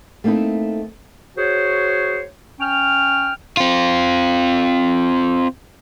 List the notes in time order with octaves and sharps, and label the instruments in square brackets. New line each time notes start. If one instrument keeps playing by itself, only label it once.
[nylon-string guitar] A3 A#3 C4 D#4 E4
[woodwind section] F#4 G#4 C5 C#5
C#4 G5 F6
[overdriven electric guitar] C4 F4